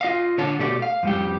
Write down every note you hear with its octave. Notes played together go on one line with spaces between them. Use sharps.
F4 D#5 F5
D3 C#5 A5
B2 A3 G4 D5
F5
F2 G3 G4